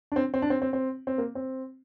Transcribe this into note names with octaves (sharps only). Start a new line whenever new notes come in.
D4
C4
C4
D4
C4
C4
C4
C4
A#3
C4